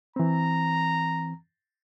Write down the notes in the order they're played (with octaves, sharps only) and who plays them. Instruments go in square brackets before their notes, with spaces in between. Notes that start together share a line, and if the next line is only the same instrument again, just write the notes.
[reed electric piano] E3 C4 [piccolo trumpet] A#5